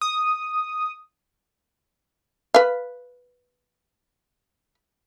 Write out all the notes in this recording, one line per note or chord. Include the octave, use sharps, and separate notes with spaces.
D#6
B4 F5